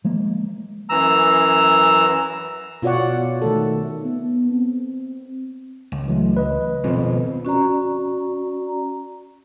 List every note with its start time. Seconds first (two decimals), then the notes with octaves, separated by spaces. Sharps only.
0.05 F3 G#3 A#3
0.89 F#2 E3 A#5 E6
2.82 B2 F4 F#4 C#5 D5 F#5
3.42 D#3 A3 A4
4.04 B3
4.51 C4
5.92 C#2
6.08 E3 F#3 A3
6.37 B4 D#5
6.84 F2 B2 D#3 G#3
7.45 C#4 F#4 D5 A#5